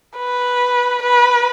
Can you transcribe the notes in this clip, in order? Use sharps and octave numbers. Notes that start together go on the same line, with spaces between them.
B4
B4